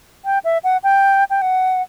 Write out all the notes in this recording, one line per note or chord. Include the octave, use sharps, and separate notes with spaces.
G5
E5
F#5
G5
G5
F#5